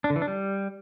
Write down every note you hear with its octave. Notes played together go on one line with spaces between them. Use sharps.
D4
D3
E3
D4
G3